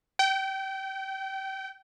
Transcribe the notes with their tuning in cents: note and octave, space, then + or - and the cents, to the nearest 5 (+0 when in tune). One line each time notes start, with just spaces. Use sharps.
G5 -25